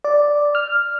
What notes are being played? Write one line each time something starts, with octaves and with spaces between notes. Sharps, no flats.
D5
F6